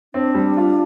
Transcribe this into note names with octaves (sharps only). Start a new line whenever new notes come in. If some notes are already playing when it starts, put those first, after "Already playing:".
C4 D4
G3
F4